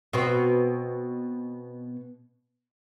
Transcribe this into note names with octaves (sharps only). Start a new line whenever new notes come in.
B2 C4